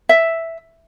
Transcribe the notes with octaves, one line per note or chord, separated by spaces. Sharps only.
E5